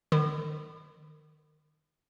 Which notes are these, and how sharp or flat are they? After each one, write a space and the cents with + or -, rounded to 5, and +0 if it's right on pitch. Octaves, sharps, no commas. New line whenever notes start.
D#3 -30 B5 +30 D#6 -45